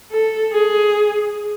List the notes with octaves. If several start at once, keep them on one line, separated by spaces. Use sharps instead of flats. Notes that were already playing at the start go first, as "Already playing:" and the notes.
A4
G#4